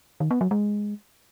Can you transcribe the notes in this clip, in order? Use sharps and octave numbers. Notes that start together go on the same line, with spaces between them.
D#3
B3
F#3
G#3